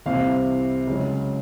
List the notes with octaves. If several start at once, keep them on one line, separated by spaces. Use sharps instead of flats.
C2 C3 E3 F5
C#2 C#3 F#3